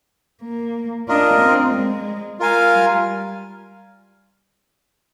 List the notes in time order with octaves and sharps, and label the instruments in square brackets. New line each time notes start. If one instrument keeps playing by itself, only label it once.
[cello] A#3
[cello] D4 [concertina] F4 A#4 D#5
[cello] C4
G#3
[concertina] F4 A#4 F5 G#5
[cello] G3